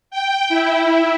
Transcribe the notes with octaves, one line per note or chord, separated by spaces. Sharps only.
G5
E4